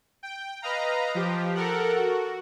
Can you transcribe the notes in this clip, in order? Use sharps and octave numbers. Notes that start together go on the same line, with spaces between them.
G5
B4 D#5 F5 A#5
F3 G4
A4 A#4 F#5
F#4